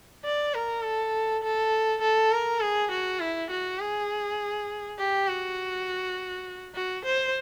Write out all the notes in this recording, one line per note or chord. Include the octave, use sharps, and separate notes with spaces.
D5
A#4
A4
A4
A4
A#4
G#4
F#4
E4
F#4
G#4
G4
F#4
F#4
C5